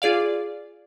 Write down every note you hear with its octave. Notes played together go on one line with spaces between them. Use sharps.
F4 G#4 D5 F5